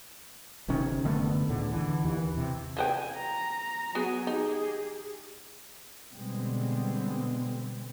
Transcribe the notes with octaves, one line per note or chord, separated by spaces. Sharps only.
G1 C3 D#3 C#4
F#1 D3 A3 B3
C#2 A2 D3
D3 E3
D#2 E3
C3
F3 B4 G5 G#5
A#5
F#3 B3 F#4 G#4 G#5
D#4 G4 G#4
B2 D3 G3 G#3 B3 C4